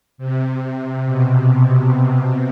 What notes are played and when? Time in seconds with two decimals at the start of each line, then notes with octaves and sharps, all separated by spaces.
0.18 C3
1.06 B2